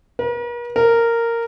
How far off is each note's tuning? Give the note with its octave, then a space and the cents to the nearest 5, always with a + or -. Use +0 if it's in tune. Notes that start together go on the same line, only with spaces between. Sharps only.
A#4 +45
A#4 -10